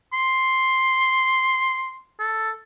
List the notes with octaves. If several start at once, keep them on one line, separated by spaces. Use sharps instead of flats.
C6
A4